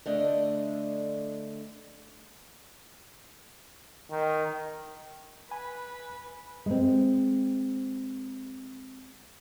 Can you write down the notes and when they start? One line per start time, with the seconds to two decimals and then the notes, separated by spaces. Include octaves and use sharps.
0.06 D3 A3 D4 D#5
4.11 D#3
5.51 B4 G#5 B5
6.66 G#3 C4